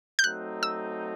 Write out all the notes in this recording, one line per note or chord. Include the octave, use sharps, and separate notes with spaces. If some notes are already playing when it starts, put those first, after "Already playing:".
G6
F#3 A3 C4 D#4 F#6
E6